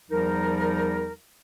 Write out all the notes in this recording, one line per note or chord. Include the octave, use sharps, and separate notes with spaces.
E2 F3 G3 D#4 A#4